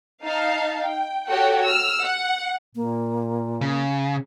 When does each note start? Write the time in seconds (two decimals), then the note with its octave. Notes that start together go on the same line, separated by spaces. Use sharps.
0.24 D#4 F5 A5
0.84 G5
1.28 F#4 G4 A4 C#5 F#5 G5
1.64 E6 F6
2.02 F#5
2.75 A#2 A#3
3.61 C#3